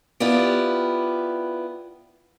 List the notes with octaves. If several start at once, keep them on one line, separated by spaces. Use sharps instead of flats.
B3 D4 E4 F4 G4